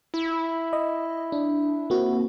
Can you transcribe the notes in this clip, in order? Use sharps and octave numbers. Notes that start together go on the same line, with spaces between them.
E4
D#5
D4
A#3 C4 F#4